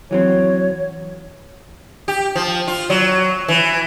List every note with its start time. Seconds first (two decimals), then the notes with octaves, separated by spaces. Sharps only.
0.11 E3 F#3 C4 C#5
2.08 G4
2.35 F3
2.68 F4
2.90 F#3
3.48 E3